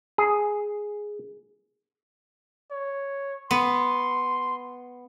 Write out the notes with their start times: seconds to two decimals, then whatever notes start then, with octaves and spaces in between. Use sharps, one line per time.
0.18 G#4
2.71 C#5
3.51 B3 C6